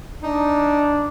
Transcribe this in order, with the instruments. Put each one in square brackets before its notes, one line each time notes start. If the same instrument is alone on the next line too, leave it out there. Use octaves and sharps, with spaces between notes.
[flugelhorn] D4 [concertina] D#4